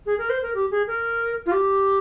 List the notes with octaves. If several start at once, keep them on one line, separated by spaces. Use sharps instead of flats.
G#4
A#4
C5
A#4
G4
G#4
A#4
F4
G4